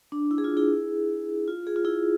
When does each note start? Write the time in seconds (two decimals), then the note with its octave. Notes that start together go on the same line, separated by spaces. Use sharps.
0.12 D4
0.31 E4
0.38 G#4
0.44 F4
0.57 E4 G#4
1.48 F4
1.67 G#4
1.76 F4
1.85 E4 G#4